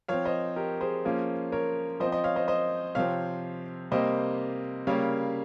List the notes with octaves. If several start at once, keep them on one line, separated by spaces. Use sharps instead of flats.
F3 C4 C#5 F5
C5 D#5
G4 A#4
G#4 C5
F3 A#3 C#4
A#4 C#5
F3 C4 C5 D#5
C5 D#5
C#5 F5
C5 D#5
C5 D#5
C3 F3 C4 C#5 F5
C3 G3 A#3 C5 D#5
C#3 G3 A#3 C#5 F5